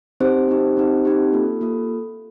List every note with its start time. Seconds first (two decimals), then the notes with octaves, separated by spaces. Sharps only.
0.20 C4 D#4 G4 C5
0.48 C4 D#4 G4
0.77 C4 D#4 G4
1.05 C4 D#4 G4
1.33 A#3 F4 A4
1.61 A#3 F4 A4